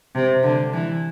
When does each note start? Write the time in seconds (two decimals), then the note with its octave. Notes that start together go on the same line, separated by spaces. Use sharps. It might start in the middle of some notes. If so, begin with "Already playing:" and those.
0.15 C3
0.43 D3
0.73 E3